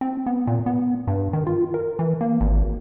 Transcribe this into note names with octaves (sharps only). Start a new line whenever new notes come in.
C4
B3
A#2
B3
G2
D#3
F4
A#4
E3
A#3
G#1